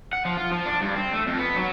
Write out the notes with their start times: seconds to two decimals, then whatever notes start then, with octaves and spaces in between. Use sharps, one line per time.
0.13 F#5
0.25 F3
0.37 F4
0.52 F3
0.66 D4
0.82 G2
0.96 C4
1.14 A3
1.27 F2
1.39 B3
1.56 F#3